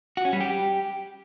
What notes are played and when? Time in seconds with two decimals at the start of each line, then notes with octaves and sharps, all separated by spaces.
0.17 F#4
0.25 C#4
0.33 G3
0.41 G4